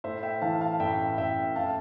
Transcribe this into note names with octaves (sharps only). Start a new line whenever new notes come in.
A2 C5 E5
E5 G5
E3 F5 A5
F5 A5
A1 E5 G5
A1 E5 G5
F2 F5 A5